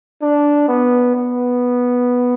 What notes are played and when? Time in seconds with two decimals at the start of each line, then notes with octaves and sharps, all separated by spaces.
0.22 D4
0.68 B3
1.15 B3